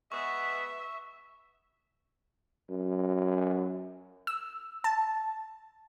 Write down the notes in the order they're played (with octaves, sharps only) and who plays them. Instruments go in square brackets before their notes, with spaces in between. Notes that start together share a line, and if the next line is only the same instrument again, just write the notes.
[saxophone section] G#3 B3 [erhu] E5 [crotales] C#6
[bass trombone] F#2
[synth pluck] E6
A5